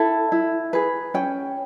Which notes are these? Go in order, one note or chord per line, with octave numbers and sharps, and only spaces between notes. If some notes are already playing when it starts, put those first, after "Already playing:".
Already playing: E4 A4 G5
E4
G#4 B4
C#4 G5